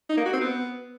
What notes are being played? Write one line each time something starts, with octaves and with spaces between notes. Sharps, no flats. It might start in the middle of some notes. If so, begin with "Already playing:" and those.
D#4
A#3
F#4
C4
B3